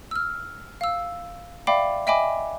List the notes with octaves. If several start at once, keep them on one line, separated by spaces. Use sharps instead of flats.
E6 F6
F5 E6
D5 E5 F5 G5 B5 D6
D#5 E5 G5 G#5 B5 D6